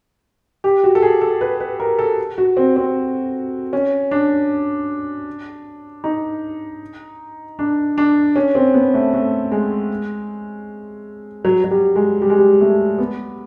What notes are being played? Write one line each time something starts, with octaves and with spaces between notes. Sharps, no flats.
G4
F#4
A4
G#4
A4
B4
B4
A#4
A4
F#4
C4
C4
C#4
D4
D#4
D4
D4
C#4
C4
B3
A3
A3
G#3
F#3
F#3
G3
G#3
G3
G#3
G3
A3
B3